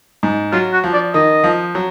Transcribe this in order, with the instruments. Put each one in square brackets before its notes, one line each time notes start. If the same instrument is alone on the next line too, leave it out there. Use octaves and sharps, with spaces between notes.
[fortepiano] G#2
[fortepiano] F#3 [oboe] F4
[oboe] F#4
[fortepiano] F3
[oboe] D5
[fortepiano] D#3 [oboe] D#5
[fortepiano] F3
F#3